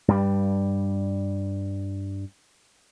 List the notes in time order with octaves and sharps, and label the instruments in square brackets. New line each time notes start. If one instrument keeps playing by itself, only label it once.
[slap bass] G2 G3